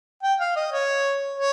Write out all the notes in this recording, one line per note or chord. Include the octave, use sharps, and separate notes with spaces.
G5
F5
D#5
C#5
C#5